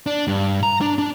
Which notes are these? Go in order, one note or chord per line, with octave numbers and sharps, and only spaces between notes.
D4
G2
A#5
D4
D4